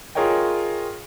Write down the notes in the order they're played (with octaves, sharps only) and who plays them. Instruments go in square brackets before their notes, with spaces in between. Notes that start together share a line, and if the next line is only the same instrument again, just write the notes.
[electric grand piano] F4 G#4 A#4 C#5 D#5 G5